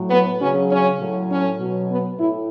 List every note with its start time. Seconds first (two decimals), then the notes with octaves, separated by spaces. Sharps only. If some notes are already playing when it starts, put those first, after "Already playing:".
Already playing: A2 F#3
0.10 B3
0.40 C#3 F#3 C#4
0.70 C#4
1.00 A2 F#3
1.30 C#4
1.60 B2 F#3
1.90 B3
2.20 A2 E4